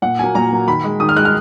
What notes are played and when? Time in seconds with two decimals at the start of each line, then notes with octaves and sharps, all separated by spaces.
0.02 A#2 F#5
0.19 F#3 A#3 G#5
0.35 A#2 A#5
0.51 F#3 A#3
0.67 D#3 B5
0.84 G#3
1.00 D#3 D#6
1.09 F6
1.16 G#3 F#6
1.25 F6